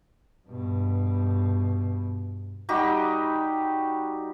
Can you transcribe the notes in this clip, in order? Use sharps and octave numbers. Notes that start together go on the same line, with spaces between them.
G2 B2
G3 D#4 F#4 G4